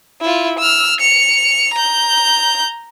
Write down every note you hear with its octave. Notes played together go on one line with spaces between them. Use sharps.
E4 F4
E6 F6
C#7 F7
A#5 G6